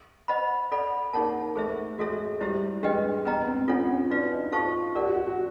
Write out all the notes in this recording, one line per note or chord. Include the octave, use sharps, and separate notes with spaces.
C5 D#5 F#5 B5
A4 D5 F#5 B5
A#3 D#4 G#4 C#5 F#5 A5
A3 G#4 C5 E5
G#3 F#4 A4 C#5 E5
G3 E4 G4 C5 E5
G#3 D4 G4 B4 D#5 G5
B3 B4 D#5 G5 A#5
C4
C#4 D4 F4 A4 C#5 F#5
C4
C#4
D4 D#4 F#4 B4 D5 F5
D#4
F4 A4 C5 F5 A5 C#6
G4 A#4 D5 F#5
F#4
F#4
F#4